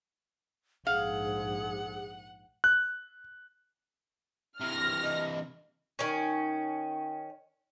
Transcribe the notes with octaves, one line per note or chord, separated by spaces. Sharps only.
A#1 G#2 G#4 F5 F#5
F#6
C3 E3 F6 A#6
D#5
D#3 C#4